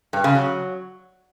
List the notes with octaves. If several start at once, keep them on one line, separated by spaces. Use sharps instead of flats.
G2
C#3
F#3